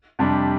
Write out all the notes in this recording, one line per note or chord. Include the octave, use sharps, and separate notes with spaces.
F2 C3 G3 D4